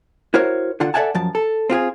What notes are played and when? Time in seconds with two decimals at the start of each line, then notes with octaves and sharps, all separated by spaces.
0.34 E4 F#4 A#4 C5 C#5
0.80 D3 F4 F#5
0.94 A4 D5 E5 F#5 G#5 A5
1.15 F#2 F3 A5
1.35 A4
1.70 C4 F4 G4 G#4